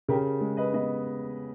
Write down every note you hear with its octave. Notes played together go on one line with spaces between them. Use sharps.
C#3 G4 A#4
G#3
B4 D#5
B3 B4 D#5